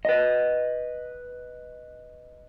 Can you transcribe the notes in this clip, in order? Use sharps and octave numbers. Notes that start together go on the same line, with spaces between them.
B4 D#5